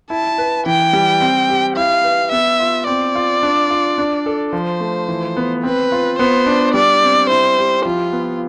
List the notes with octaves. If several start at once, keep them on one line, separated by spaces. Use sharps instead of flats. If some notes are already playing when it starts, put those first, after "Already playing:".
E4 A5
B4
E3 G5
G3
C4
G4
E4 F5
B4
B3 E5
F4
C4 D5
F4
D4
F4
D4
A4
F3 C5
A3
E3
B3
C4 B4
F4
B3 C5
D4
G3 D5
C4
E4 C5
G4
F3 F4
B3